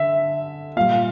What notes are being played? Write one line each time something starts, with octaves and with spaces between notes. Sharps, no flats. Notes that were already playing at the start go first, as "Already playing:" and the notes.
Already playing: D3 E5
A#2 G3 F5